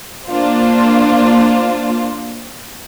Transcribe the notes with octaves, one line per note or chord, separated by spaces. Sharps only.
A#3 D4 F4 C5